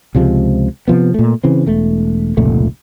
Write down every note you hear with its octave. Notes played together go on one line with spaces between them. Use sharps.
C#2 C3 F3 G#3
C3 F3 B3
A#2 A3
C#3 E3 C4
E1 A3
F1 C#2 A#2 A3